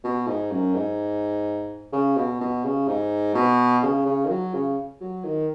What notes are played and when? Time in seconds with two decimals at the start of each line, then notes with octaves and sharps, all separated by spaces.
0.04 B2
0.27 G#2
0.51 F#2
0.75 G#2
1.93 C#3
2.17 B2
2.41 B2
2.64 C#3
2.88 G#2
3.35 B2
3.83 C#3
4.06 C#3
4.24 D#3
4.29 F#3
4.54 C#3
5.01 F#3
5.24 D#3